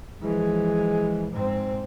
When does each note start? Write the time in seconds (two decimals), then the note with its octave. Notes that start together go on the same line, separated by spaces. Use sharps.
0.21 E3 F3 G#3
1.31 G#2 C4